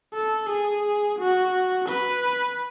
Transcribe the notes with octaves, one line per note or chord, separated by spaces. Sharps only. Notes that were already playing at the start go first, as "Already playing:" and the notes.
A4
G#4
F#4
B4